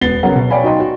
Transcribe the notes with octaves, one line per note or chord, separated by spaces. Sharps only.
E1 B3 A6 C7 G7
C#3 F#3 B3 A#4 F#5
B2
C#5 D5 F5 G5 G#5 B5
D#4 F#4 D#5 G5 C6
F#4